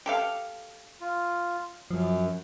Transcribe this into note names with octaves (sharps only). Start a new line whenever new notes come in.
G4 A4 F5
F4
F#2 F3